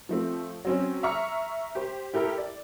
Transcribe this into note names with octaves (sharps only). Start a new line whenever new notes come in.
F3 A3 C4
F#3 C4 C#4
E5 A#5 C#6 F6 C#7
G4 C5
E4 G4 A4 A#4
D5